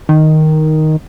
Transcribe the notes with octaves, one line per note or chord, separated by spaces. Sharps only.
D#3